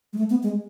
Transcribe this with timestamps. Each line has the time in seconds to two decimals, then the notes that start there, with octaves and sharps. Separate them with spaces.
0.13 G#3
0.18 A3
0.30 B3
0.43 G#3